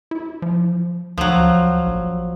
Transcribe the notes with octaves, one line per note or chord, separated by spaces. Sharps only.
E4
F3
D2 F3 F#3
A#1